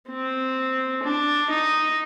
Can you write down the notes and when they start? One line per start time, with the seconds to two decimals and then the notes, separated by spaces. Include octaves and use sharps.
0.09 C4
1.03 D4
1.50 D#4